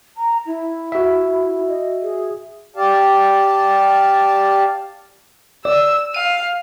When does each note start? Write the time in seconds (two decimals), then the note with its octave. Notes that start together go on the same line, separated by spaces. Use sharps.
0.17 A#5
0.46 E4
0.92 F#4 E5
1.67 D#5
2.02 G#4
2.76 G4 D5 F5 A5
5.65 D5 E6
6.14 F5 D#7